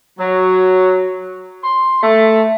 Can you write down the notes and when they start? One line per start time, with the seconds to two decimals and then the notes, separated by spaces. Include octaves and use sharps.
0.19 F#3
1.63 C6
2.02 A3